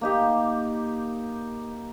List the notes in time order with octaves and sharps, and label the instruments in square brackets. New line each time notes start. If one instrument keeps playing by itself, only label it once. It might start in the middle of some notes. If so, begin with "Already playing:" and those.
[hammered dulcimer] A#3 D#4 G4